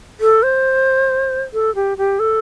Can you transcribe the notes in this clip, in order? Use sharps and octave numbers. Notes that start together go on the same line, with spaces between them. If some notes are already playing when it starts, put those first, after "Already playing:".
A4
C5
A4
G4
G4
A4